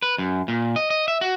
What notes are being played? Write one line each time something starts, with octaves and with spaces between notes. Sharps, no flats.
B4
F#2
A#2
D#5
D#5
E5
F#4